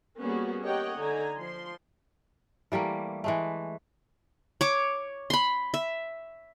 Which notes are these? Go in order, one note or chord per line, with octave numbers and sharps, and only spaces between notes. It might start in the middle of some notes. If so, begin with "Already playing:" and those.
G3 A#3 B3 C#4 F#4 G#4
G4 A#4 C#5 D#5 F#5 G5
D3 D#4 G#5 A#5
F3 C6
E3 G3 A3 A#3
E3 G#3 A3
C#5 D6
B5 C6
E5